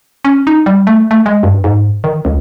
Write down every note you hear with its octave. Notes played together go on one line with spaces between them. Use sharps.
C#4
D#4
G3
A3
A3
G#3
G2
G#2
D#3
C#2